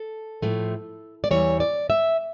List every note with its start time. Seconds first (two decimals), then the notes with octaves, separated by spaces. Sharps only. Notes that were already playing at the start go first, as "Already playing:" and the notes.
Already playing: A4
0.42 A2 F3 A3
1.24 D5
1.31 E2 E3 G3 C#5
1.60 D5
1.90 E5